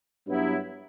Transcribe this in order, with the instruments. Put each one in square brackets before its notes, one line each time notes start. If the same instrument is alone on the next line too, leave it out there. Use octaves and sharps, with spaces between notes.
[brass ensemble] G2 F#3 B3 E4